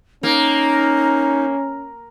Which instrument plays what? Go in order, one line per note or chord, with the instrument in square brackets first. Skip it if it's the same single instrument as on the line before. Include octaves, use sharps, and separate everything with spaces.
[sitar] A#3 [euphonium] C#4 [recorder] D#4